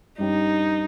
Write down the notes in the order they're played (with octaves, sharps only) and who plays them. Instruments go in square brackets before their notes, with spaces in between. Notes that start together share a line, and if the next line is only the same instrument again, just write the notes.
[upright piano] G2 G3 C#4 G4 [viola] D#4